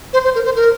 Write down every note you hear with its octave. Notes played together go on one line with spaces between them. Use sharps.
C5
C5
A#4
C5
A#4